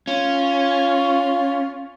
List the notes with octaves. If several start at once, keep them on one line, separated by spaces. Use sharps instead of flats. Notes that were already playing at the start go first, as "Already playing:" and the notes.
C#4 F4